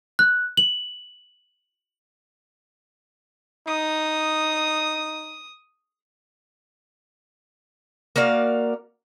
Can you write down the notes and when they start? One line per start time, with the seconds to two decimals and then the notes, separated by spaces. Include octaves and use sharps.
0.19 F#6
0.57 F#7
3.67 D#4 D#6
8.16 A#3 F#4 D5 F5